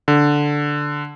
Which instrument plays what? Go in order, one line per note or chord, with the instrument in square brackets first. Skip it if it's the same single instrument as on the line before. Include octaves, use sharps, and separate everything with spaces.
[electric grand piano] D3